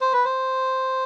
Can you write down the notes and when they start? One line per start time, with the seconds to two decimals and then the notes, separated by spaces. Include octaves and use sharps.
0.01 C5
0.13 B4
0.25 C5